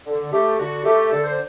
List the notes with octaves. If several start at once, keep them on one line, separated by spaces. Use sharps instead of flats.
D3
A3 G4
D3 F#4
A3 G4
D3 A4
C5